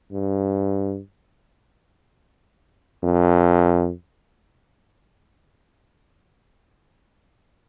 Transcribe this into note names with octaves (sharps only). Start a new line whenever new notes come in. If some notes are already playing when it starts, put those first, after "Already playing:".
G2
F2